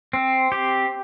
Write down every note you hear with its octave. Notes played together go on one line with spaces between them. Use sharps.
C4
G4